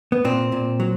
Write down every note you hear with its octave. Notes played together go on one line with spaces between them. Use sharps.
B3
A#2 C4
A#2
F#3